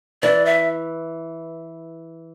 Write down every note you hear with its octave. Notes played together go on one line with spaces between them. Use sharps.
E3 D5
E5